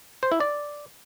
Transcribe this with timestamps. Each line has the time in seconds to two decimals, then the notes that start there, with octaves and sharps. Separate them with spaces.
0.23 C5
0.32 E4
0.40 D5